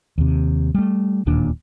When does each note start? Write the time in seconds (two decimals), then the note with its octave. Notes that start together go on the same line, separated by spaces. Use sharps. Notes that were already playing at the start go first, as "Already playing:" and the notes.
0.18 D#2 C3
0.74 G3 A3
1.26 D1 D#2 A#2 D4